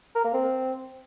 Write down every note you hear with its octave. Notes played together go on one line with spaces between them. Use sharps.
A#4
A#3
C4